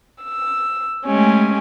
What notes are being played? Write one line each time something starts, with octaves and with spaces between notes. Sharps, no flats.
E6
G#3 A3 C#4 G4 G#5